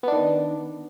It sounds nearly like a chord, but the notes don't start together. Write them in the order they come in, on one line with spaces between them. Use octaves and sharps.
B3 D4 D#3